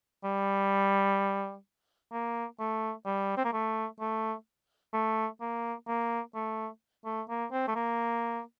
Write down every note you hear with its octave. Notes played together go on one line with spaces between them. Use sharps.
G3
A#3
A3
G3
C4
A#3
A3
A3
A3
A#3
A#3
A3
A3
A#3
C4
A3
A#3